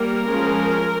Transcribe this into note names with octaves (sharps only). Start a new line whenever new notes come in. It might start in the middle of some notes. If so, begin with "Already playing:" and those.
Already playing: G3 A#3 A#4
F3 G#3 C#4